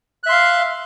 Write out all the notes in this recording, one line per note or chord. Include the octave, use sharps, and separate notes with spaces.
E5 F5 C6 F#6